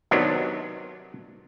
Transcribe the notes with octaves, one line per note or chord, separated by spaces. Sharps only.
C3 D#3 F#3 B3 D4